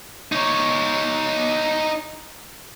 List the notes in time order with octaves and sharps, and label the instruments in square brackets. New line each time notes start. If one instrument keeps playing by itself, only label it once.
[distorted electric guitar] D#4 C#5